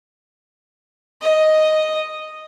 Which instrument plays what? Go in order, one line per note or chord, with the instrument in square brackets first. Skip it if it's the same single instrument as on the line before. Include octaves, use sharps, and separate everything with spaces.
[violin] D#5